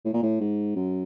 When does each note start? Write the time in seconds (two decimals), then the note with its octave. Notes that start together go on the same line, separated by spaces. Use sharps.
0.05 A2
0.13 A#2
0.22 A2
0.40 G#2
0.76 F#2